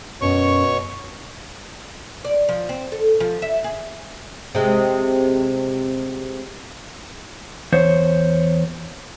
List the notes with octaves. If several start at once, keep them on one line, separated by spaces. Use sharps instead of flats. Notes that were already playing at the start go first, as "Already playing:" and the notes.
F#2 B2 C#5 C#6
D5
F3
C4
A4
F3
E5
G#4
C3 G#3
E2 C5 C#5